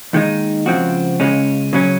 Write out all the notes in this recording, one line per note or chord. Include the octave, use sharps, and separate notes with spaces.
D#2 D#3 G#3 D#4
C#2 C#3 F3 C4 F#4
C#2 C#3 G#3 C#4
C#3 F#3 C#4